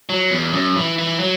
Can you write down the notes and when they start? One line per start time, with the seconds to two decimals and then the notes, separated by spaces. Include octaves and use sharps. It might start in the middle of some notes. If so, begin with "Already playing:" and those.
0.09 F#3
0.31 E2
0.53 F#2
0.76 E3
0.99 E3
1.20 F#3